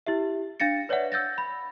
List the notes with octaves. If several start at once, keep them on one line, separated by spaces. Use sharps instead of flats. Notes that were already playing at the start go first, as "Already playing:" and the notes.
E4 G4 E5
D4 F5 A6 A#6 C#7
B4 C#5 D5 E5 F#5
E6 G6 A6 A#6
B5